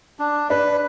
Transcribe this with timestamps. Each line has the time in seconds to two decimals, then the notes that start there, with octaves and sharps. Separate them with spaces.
0.19 D4
0.50 D4 B4